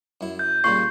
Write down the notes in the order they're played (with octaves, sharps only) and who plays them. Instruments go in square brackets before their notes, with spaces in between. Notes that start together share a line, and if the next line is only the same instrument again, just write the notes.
[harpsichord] F#2 E4
[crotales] G6
[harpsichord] A#2 C#3 G3 [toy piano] C6 C#6 [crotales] C7